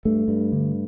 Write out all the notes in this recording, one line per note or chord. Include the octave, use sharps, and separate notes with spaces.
G2 A3
G2
D3